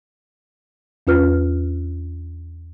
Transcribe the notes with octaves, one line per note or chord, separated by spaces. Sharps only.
E2 C#4 F4 B4 F6